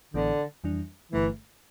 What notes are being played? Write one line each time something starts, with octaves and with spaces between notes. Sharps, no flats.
A1 A2 D3 E3 B3
F2 E3 G3 D4
G1 G2 D3 E3 A3